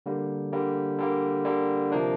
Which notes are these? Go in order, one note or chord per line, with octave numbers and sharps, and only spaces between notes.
D3 G3 A#3
D3 G3 A#3
D3 G3 A#3
D3 G3 A#3
C3 F3 A#3 D4